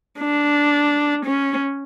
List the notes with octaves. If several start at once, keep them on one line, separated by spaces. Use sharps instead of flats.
D4
C#4